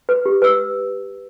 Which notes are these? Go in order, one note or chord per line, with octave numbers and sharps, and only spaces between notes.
B4
G4
B4 E6